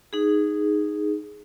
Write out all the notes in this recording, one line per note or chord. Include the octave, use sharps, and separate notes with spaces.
D#4 G#4